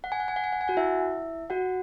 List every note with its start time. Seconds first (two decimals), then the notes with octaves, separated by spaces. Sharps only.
0.04 F#5
0.12 G#5
0.20 F#5
0.28 G#5
0.36 F#5
0.44 G#5
0.53 F#5
0.61 G#5
0.68 F#4 F#5
0.77 E4 E5
1.50 F#4 F#5